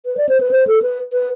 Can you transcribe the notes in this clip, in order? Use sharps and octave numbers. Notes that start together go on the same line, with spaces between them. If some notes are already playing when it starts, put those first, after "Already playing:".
B4
D5
C5
B4
C5
A4
B4
B4